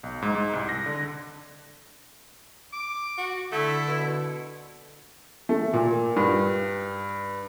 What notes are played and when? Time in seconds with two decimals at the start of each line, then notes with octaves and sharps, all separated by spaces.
0.03 B1
0.22 G#2
0.35 G#2
0.53 C2
0.69 A#6
0.86 D3
2.73 D6
3.18 F#4
3.52 D3 A3 E4
3.87 B2
5.49 A3
5.73 A#2
6.16 G2